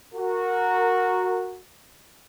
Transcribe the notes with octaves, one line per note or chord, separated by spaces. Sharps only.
F#4 A#4